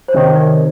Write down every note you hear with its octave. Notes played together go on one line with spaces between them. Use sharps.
C5
C3 D#3 C#5
D5